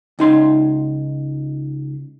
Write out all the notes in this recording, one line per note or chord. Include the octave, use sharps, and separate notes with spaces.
C#2 D#4 C6